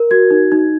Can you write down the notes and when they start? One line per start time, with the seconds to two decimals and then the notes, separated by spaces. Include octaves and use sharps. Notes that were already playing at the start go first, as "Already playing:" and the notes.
Already playing: A#4
0.11 F#4 G#6
0.31 D#4
0.52 D#4